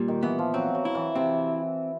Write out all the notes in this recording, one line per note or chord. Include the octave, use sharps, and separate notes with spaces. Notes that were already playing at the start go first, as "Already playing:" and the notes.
Already playing: A#2 G3
D#3
E3 B3
F3
F#3 C4
F#3
E4
E3
C3 C4